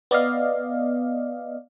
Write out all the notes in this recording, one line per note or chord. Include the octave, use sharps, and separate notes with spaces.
B3 D5 D#5 F5